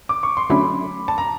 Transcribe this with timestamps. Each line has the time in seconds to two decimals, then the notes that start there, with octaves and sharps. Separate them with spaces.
0.09 D6
0.23 C#6
0.37 C6
0.50 D3 F#3 A3 C#4 B5
1.08 A5
1.18 A#5